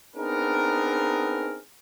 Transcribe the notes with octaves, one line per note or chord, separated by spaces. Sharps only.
B3 C4 D4 D#4 G#4 A#4